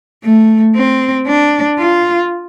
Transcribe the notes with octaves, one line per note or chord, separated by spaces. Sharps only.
A3
C4
D4
F4